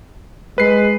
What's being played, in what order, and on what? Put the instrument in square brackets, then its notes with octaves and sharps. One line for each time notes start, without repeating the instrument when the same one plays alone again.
[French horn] G#3 [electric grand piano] B4 C7